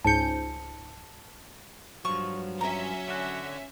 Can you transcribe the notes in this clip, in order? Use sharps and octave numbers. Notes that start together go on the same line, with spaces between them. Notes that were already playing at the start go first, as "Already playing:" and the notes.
C#2 G#2 A5 G6 C#7
G2 F3 F#3 C#6
C#4 E5 A#5
D3 F#4